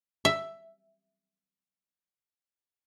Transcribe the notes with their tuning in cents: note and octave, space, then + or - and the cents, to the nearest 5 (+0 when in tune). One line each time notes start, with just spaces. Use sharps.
E5 +5